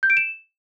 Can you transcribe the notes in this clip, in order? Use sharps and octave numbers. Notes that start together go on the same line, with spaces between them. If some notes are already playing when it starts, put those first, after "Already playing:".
G6
D7
E7